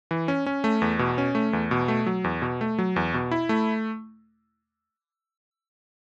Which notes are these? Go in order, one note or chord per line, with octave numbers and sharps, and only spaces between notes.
E3
C#4
C#4
A3
E2
B2
C#4
A3
E2
B2
A3
F#3
E2
B2
A3
F#3
E2
B2
E4
A3